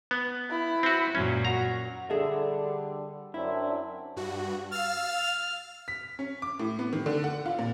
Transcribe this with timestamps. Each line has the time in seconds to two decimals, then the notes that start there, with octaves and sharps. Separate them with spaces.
0.11 B3
0.50 E4 B5
0.83 C4 F#4
1.15 F#2 A#2 F#3 C#4
1.45 F#4 A#5
2.10 D3 G3 G#4 A4 E5
3.34 F#2 C4 D4 E4
4.16 G2 F#4
4.72 F5 E6 F6 A6
5.88 B6
6.19 C#4
6.42 D6
6.60 A2
6.79 B3
6.93 D#3
7.06 D3
7.24 F#5
7.46 F4
7.59 A#2